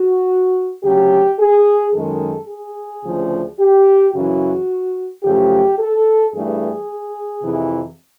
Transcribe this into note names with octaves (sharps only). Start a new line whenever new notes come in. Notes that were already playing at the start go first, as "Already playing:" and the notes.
Already playing: F#4
D2 C#3 F#3 G4
G#4
F#2 D#3 G#3 A4
G#4
D2 C#3 F3
G4
F#2 C#3 E3 F#4
F#2 C#3 F3 A3 G4
A4
G2 E3 A3 G#4
F2 C3 E3